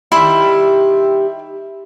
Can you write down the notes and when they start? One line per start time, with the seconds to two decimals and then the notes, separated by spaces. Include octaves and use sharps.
0.12 D#3 G3 E4 E5 C6